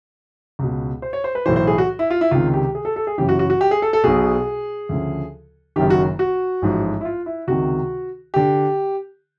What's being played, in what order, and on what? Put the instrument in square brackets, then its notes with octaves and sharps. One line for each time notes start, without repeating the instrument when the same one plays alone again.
[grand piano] C#2 B2
C5
C#5
C5
B4
B1 A2 E3 C5
C5
G#4
F#4
E4
F4
E4
C#2 C3 D#3 F4
G4
G#4
A4
A4
G#4
F#1 F#2 C#3 E3 G4
F#4
F#4
F#4
G4
G#4
A4
A4
B1 B2 G#4
D2 C#3 F3
F#1 F#2 D#3 G4
F#4
F#4
A1 G#2 F3
E4
F4
E4
C#2 C3 D#3 F#4
D3 G4